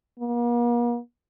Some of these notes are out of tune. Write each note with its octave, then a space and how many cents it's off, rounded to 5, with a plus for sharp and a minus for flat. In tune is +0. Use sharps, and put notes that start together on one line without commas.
A#3 +45